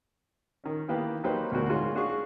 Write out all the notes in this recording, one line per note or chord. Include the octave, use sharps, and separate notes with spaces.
D#3 C#4
D#3 E3 A#3 B3 G4 B4
F#3 A#3 D#4 G4 B4 C5
D2 B2 F#4 A#4
G#2 G#3 F4 F#4 C#5 C6
D4 F#4 G#4 F5 C#6